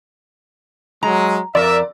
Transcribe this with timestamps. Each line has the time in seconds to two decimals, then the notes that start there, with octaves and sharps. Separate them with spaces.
1.03 F#3 G#3 A#5
1.55 F2 A#4 D5 E5